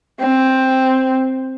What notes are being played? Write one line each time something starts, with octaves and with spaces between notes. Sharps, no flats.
C4